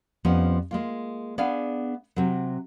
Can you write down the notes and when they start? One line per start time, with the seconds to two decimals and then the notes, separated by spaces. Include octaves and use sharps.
0.25 F2 F3 G3 B3 C#4
0.71 G#3 A#3 F4
1.38 B3 D4 G#4 D5 F5
2.16 C3 F#3